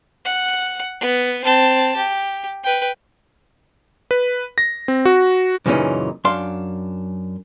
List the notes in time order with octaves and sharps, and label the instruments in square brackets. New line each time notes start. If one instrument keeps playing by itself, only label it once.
[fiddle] F#5
B3
C4 A5
G4
B4 G5
[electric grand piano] B4
A#6
C4
F#4
[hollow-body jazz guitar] F#2 A#2 C#3 E3 C#4 D#4
F#2 D4 F5 C6